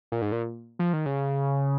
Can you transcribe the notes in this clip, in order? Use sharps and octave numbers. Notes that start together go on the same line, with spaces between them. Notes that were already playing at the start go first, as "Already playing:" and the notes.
A#2
G#2
A#2
F3
D#3
C#3